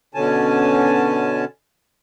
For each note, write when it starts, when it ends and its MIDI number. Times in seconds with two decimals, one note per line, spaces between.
0.15 1.45 47
0.15 1.45 50
0.15 1.45 61
0.15 1.45 80
0.15 1.45 81